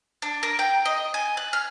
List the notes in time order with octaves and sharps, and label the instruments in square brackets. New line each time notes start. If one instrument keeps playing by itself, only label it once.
[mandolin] D4
A#4
G5
D#5
G#5
F#6
F6